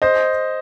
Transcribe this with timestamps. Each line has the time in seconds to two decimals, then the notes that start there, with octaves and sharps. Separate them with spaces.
0.02 C5 D#5